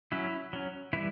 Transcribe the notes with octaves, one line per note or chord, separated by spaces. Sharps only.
F#3 C#4 E4
F#3 C#4
E3 G3 E4